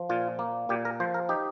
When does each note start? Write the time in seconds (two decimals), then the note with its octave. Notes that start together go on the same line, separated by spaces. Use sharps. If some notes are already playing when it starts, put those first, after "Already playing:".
Already playing: F3
0.09 A#2 F4
0.39 A#3
0.69 A#2 G4
0.85 A#4
1.00 F3 C5
1.14 A#4
1.29 D#4 G4